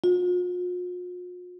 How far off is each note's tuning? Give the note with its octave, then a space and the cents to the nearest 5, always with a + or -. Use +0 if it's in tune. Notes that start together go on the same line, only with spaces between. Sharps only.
F4 +45